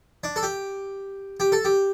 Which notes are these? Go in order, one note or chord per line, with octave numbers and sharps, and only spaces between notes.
D4
A4
G4
G4
A4
G4